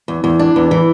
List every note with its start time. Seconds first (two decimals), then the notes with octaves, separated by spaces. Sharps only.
0.08 E2
0.24 E2
0.39 D4
0.56 E2
0.71 E3